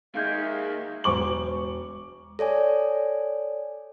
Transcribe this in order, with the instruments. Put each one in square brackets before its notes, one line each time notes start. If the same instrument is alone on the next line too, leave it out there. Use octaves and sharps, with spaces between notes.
[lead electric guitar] D#3 A#3 [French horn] G#3 [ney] E5 [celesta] F5 G6 G#6
[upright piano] E1 C#6 D6 F#7
[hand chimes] A4 C#5 D5 G#5